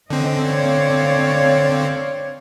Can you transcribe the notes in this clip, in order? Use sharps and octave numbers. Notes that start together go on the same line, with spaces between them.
D3 E3 C4 C#4 D#5
C#5 D5 F5